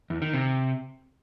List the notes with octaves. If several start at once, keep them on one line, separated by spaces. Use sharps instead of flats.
E2
D#3
C3